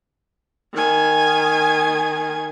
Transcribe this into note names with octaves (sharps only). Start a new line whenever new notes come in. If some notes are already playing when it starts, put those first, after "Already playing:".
D#3 G#5